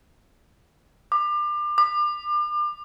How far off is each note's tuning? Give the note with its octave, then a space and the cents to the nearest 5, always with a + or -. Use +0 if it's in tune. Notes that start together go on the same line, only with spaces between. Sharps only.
D6 +30
D6 +35